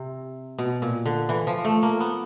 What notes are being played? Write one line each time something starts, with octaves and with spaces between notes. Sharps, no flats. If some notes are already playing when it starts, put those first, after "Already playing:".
Already playing: C3
B2
A#2
D3
E3
F3
A3
A#3
B3